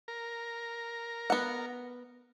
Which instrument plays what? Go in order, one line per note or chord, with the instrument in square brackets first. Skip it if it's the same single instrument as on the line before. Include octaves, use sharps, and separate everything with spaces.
[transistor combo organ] A#4
[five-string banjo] B3 F#5